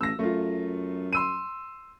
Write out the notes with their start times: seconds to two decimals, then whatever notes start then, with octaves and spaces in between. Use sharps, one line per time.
0.01 A1 E6 A#6
0.19 F#2 A3 F4
1.13 C6 E6 D#7